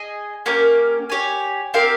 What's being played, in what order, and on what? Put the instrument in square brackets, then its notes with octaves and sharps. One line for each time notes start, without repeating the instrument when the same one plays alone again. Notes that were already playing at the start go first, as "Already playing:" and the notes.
Already playing: [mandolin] G#4 D#5 G#5
A#3 C#4 G4 A#4
G4 C#5 G#5
C4 G4 A#4 F5